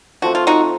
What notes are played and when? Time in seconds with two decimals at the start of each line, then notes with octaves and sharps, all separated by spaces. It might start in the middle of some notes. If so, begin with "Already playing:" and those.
0.22 F3 A3 C4 F#4
0.35 F4
0.47 D#4 F#4